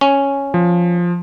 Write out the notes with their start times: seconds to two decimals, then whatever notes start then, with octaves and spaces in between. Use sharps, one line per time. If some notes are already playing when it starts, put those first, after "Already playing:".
0.01 C#4
0.54 F3